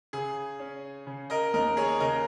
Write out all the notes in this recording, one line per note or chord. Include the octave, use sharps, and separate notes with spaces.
C#3 G#4
C#4
C#3
A#4 D#5
D#2 A#4 D#5
G#4 C#5
C#3 A#4 D#5